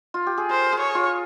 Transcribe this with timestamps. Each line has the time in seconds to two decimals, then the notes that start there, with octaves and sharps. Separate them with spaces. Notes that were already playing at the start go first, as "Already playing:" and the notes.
0.14 F4
0.27 G4
0.38 G#4
0.49 A#4 C5
0.72 G#4
0.79 C#5
0.95 F4